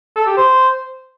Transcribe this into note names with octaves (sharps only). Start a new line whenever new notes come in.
A4
G4
C5